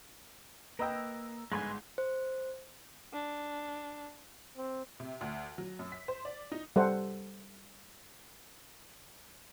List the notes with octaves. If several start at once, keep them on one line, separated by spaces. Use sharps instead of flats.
A#3 B4 D#5 G5 A#5 E6
G1 G#2 G#3 B4 G#5 C6
C5
D4
C4
C3
D2
F#3
F#2
B6
C5
D5
D#4
G3 A4 C5 F#5